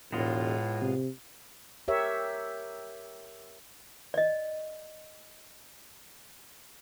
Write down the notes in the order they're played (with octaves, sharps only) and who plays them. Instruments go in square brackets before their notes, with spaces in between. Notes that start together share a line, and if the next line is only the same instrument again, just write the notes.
[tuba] E1 [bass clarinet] A2 [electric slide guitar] G#3 B3 F4
[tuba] C3
[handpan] G4 A#4 C#5 E5
[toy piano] D5 D#5